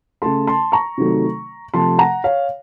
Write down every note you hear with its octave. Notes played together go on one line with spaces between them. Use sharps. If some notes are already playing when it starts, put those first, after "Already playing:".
C#3 A3 A5 C6
A5 C6
A#5 C#6
C3 D#3 F#3 A3
C3 F3 A3 A5 C6
F#5 A#5
C#5 F5